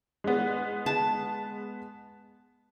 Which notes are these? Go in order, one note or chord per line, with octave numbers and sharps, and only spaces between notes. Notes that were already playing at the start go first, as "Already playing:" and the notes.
G#3 B3
A5